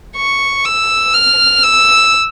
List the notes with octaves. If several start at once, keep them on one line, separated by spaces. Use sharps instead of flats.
C#6
E6
F6
E6